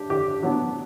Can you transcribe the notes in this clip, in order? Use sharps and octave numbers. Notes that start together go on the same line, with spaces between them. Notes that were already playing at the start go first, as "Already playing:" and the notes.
Already playing: D4 G4
D3 G4
F#3 B3 D4